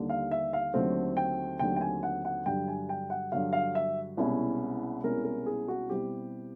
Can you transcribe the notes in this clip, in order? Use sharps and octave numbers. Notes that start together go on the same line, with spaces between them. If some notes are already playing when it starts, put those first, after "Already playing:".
Already playing: D#2 D3 G3 A#3
F5
E5
F5
D#2 D3 F#3 A3 C4
G5
D#2 D3 F#3 A3 C4 G5
G5
G#5
F#5
F#5
G2 D3 F#3 G5
G#5
G5
F#5
G2 D3 F#3 F5
F5
E5
C2 B2 G#3 C#4 E4
C2 B2 G#3 C#4 E4 A#4
A#4
G#4
F#4
B2 G3 C4 E4 G4